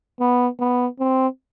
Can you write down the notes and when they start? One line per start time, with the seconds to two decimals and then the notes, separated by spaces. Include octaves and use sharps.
0.20 B3
0.59 B3
0.99 C4